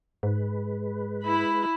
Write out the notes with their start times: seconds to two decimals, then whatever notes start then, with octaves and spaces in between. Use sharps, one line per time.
0.23 G#2 G#3 B4
1.23 E4 B5